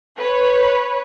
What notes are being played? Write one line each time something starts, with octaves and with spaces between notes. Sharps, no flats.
B4 C#5